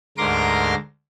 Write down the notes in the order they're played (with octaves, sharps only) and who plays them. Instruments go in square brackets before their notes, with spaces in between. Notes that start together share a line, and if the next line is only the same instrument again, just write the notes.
[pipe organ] D2 G#2 A#4 C6 D6 A#6